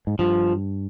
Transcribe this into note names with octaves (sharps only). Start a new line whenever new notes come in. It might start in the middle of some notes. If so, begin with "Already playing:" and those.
G#2
G2 F3